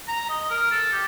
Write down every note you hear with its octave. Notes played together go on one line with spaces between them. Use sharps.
A#5
D#5
A#4
A4
G4